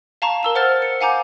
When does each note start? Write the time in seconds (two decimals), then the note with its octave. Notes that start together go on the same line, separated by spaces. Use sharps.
0.22 F5 A5 A#5 C#6
0.43 A#4 E6 E7
0.55 C5 F#5 F6 A6
0.82 C#7
1.01 F5 F#5 G#5 A#5 D6 G6